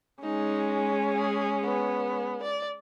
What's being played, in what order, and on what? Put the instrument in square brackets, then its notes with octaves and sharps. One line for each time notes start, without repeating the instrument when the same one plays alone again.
[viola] G#3 C#4 [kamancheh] D#4
[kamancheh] G#4
B3
D5